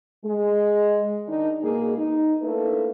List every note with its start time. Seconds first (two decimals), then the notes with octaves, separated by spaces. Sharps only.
0.25 G#3
1.27 D#3 D4 D#4
1.61 B2 G#3 A#3 G#4
1.97 D#4
2.42 A3 A#3 D4 E4 A4 B4